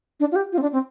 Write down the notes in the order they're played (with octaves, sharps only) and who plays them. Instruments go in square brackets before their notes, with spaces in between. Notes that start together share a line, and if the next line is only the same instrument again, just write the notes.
[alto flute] D4
F4
G4
F4
C4
D4
C4